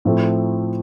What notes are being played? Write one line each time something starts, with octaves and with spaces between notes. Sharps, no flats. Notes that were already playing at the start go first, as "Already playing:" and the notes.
A2 F3 A3 C4 E4